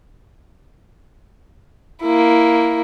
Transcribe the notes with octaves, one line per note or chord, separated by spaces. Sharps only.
A#3 E4